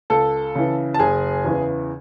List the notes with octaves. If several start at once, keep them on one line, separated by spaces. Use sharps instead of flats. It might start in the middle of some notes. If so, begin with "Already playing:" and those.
C#2 A4 A5
C#3 E3
A5
F#1 G#4 G#5
E2 C#3 E3